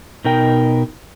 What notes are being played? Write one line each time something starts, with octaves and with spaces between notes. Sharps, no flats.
B2 D#4 A#4 G5